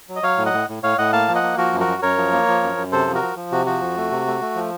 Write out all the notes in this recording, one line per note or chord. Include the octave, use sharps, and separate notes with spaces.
F#3
D#5
F#3 C#5 F5
A2
D#5 F#5
A2
A2
A2 C#5 F5
A2 D#5 F#5
A#3 F5 A5
F3
D#5 F#5
A#3
F3 F#4 A#4
F#2
F#4 A#4
F#2
F#2 A#4 C#5
F3
A#3
F3
F#2
F#2
C3 A4 C5
F3
F#4 A#4
F3
F3
C3 F#4
F3 F#4
F2
A3
C3
A3
A3
F3